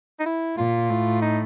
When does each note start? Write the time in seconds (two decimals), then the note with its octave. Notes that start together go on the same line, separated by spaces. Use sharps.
0.19 D#4
0.26 E4
0.57 A#2 F4
0.90 A2
1.22 D#4